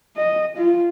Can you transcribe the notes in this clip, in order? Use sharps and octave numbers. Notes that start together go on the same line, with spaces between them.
D#5
F4